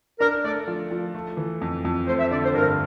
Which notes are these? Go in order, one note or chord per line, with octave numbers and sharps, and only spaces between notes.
D4 A#4
A3 D5
F3
F3
A3
E3
F2
F2
A3 C5
E5
D3 D5
C5
G2 A#4